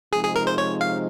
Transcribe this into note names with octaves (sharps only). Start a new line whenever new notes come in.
C3 F3 G#3 D#4 G#4
G#4
A#4
C5
C#5
F5